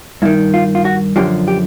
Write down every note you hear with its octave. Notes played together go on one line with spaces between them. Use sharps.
G2 D#3 E4
F4
F4
F#4
F#2 D3 F3 G4
G4